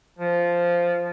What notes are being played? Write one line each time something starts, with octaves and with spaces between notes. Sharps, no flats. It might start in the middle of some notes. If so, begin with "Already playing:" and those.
F3